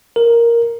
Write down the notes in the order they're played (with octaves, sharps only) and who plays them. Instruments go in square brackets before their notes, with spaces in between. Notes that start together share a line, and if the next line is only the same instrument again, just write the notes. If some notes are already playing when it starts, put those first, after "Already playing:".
[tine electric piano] A#4